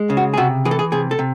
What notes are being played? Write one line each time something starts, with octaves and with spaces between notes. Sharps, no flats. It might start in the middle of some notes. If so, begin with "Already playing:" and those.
Already playing: G#3
C#3
F#4
G#4
C3 F#4
E3 G#4
A4
G#4
C3 G#4
A4
C3